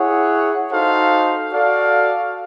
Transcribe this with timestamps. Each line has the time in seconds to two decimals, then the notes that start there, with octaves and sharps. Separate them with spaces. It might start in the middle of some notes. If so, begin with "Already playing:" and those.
Already playing: E4 G#4 C#5 F#5
0.71 D#4 F#4 A4 C5 F5
1.52 F#4 A4 D5 F5